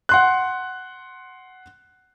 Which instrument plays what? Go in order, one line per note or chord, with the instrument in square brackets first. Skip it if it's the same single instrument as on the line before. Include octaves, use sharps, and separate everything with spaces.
[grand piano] F#5 C6 F#6